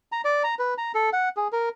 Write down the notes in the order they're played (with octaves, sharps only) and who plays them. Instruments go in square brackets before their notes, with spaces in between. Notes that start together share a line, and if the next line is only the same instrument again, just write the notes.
[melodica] A#5
D5
A#5
B4
A#5
A4
F#5
G#4
A#4